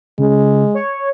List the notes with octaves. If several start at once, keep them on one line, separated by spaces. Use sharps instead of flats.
C#3 G#3
C#5